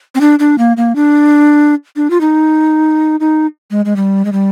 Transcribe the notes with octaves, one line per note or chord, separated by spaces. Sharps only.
C4
D4
D4
A#3
A#3
D4
D4
F4
D#4
D#4
G#3
G#3
G3
G#3
G3